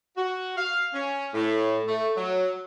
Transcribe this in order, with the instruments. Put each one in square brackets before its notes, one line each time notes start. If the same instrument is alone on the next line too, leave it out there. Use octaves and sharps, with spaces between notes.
[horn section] F#4
F5
C#4
A2
A3
F#3